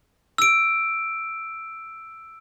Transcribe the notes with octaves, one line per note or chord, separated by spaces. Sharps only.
E6 D7